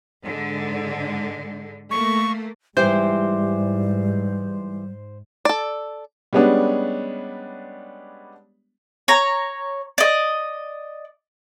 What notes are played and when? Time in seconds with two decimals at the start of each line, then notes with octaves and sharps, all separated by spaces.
0.23 G#2 D3 G#3
1.91 A3 A#3 C#6
2.77 G#2 E3 G3 G4 C5
5.45 A4 D5
6.33 G3 G#3 B3 C#4 D4
9.08 C#5 A#5
9.98 D5 D#5